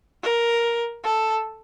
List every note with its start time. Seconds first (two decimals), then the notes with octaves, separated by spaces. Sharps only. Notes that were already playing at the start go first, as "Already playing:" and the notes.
0.23 A#4
1.04 A4